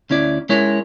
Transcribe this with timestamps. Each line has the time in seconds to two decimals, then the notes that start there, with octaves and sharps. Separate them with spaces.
0.10 D2 C#4 E4 D5
0.49 G#3 C#4 E4 A#4 C#5